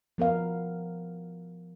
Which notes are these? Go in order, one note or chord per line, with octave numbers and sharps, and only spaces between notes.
F3 B3 A#4 F5